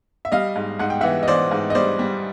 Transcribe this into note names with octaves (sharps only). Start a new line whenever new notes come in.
E5
G3 D#5 F5
G#2
G#2 F#5
G5
E3 E5 F#5
D#5
E3 C5 D5
G#2
D#5
G3 C5 D5
G3